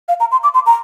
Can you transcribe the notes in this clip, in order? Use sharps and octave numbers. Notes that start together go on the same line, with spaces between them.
F5
A#5
C6
D6
C6
A#5